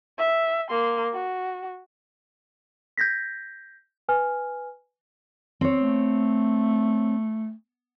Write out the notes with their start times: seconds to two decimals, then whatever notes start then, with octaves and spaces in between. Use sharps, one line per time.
0.18 E5
0.70 A#3 C6
1.13 F#4
2.98 G6 G#6 A#6 B6
4.08 B4 G#5 F6
5.61 C4 C#5
5.79 A3